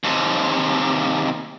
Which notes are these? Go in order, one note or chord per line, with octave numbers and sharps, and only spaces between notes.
D#2 C3